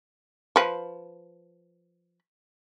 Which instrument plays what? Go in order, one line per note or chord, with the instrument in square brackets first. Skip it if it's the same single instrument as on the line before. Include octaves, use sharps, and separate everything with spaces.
[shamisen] F3 B4